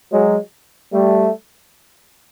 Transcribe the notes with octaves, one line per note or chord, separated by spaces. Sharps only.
F#3 G#3
G3 A3